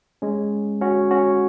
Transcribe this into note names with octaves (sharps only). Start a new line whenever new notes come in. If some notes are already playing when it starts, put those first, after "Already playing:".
G#3 C#4
C#4 F#4
C#4 F#4